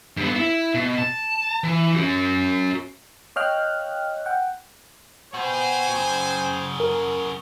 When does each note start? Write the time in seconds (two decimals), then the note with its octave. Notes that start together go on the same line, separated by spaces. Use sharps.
0.17 G2 B3
0.36 E4
0.74 B2
0.98 A5
1.64 E3
1.95 C#4 F#4
3.36 C#5 D#5 F5 G5 F6 F#6
4.26 F#5 G5
5.34 B3 F#4 C5 G5 G#5
5.93 F#2 C#3
6.80 A#4